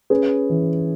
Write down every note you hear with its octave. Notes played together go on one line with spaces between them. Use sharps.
C#4 G#4 B4
E3